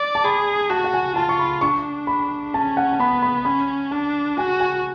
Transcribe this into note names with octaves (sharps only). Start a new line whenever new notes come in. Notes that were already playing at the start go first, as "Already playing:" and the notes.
Already playing: D5
A5
G#4 B5
F#4 A5
F#5
G#5
F4 A5
C#6
B5
D4 C#6
B5
C#4 A5
F#5
A5
B3 B5
B5
C#4 B5
D4 A5
F#4 G#5
G#5